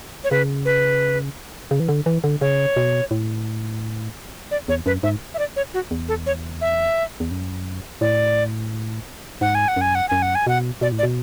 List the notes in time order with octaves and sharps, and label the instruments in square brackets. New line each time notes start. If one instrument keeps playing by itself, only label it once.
[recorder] C#5
[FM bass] C#3 [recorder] B4
[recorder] B4
[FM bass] C#3
E3
D3
E3
D3
[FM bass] C#3 [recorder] C#5
[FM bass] B2
A2
[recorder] D5
[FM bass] E2 [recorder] C#5
[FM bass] F#2 [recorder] B4
[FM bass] G#2 [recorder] E5
[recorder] E5
D5
C#5
F#4
[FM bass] E2
[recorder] A4
C#5
E5
[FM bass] E2
F#2
[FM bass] A2 [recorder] D5
[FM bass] G#2 [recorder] F#5
[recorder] G#5
F#5
[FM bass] F#2 [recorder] G#5
[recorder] F#5
[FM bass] F#2 [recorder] G#5
[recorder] F#5
G#5
[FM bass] B2 [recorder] F#5
[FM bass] B2 [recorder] D5
[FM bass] A2
[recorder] D5
[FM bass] B2